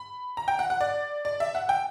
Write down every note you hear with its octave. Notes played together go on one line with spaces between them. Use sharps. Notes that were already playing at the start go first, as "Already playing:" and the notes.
Already playing: B5
A#5
G5
F#5
F#5
D5
D5
E5
F#5
G5